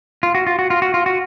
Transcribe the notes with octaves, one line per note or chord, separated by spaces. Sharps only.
F4
F#4
F4
F#4
F4
F#4
F4
F#4